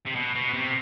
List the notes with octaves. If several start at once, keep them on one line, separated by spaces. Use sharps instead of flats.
C3
B2
B2
C3